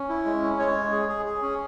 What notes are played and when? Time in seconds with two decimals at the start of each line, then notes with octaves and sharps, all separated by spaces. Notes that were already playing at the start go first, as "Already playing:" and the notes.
Already playing: C#4
0.09 E4
0.25 G#3
0.42 C#4
0.59 G#3 C#5
0.75 G#3
0.92 G#4
1.09 G#4
1.26 G#4
1.42 C#4